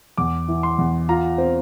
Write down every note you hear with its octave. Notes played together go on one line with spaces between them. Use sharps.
E2 D6
E3
C6
E2
F4 A#5
C4